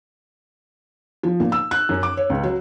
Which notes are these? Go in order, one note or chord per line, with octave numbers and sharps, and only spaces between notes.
F3
A#2
E6
F#6
F#2
D6
C#5
C#2
F#3